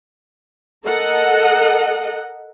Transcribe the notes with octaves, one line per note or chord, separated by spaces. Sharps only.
A4 A#4 D#5 F#5